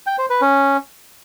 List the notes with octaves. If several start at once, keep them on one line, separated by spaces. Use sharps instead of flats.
G5
C5
B4
C#4